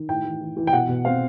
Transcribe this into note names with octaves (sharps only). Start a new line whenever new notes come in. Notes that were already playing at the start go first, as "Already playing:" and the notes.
Already playing: D#3
A2 G5
E3
E3
E3
G5
B2 F#5
B2
C4 F5